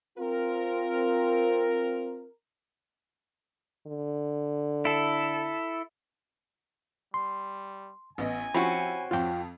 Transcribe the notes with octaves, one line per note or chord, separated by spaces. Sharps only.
C4 F4 A#4
D3
E4 A4
G3 C6
A1 B3 D#5 G#5
F3 C4 C#4 E4 F#4 G4 B5
F2 F3 F4 F5 G5